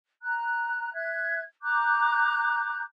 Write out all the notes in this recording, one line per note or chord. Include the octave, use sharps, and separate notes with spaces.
A#5 F#6
E5 F#6 G#6
A#5 D6 F#6 G6